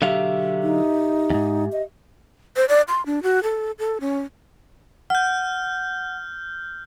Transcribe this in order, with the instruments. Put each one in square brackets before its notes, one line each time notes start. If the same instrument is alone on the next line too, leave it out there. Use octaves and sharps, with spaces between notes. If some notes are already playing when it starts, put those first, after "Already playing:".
[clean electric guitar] D3 F#3 F5 [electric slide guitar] G4 E5
[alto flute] D#4
[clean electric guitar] E2 G#2
[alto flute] D#5
[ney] C5
D5
C6
D4
F#4
A4
A4
C#4
[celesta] F#5 [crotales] F6 G6